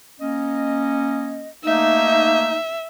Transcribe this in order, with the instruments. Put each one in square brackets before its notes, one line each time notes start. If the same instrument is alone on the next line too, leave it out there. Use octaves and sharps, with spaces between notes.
[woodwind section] A#3 C#4 D#5
[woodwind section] A3 A#3 D#4 [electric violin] E5